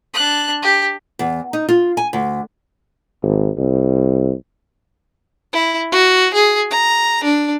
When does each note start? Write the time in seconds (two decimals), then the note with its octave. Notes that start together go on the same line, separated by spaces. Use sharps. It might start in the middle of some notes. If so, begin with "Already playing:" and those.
0.14 D4 F#6
0.62 G4
1.19 E2
1.53 D#4
1.69 F4
1.97 G#5
2.13 D2
3.22 G#1
3.58 C2
5.53 E4
5.92 F#4
6.34 G#4
6.71 A#5
7.24 D4